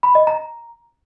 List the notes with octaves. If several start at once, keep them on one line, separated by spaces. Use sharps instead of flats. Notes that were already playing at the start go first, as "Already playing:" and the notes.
B5
D#5
A#5